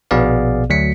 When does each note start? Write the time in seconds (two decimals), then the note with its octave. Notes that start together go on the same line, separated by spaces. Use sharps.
0.11 A#1 B2 B3 G#4 D5 F5
0.70 D2 F#3 B6 C#7